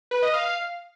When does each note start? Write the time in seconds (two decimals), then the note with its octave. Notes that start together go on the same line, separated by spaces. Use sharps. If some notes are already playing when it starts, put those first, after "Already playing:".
0.11 B4
0.22 D#5
0.34 F5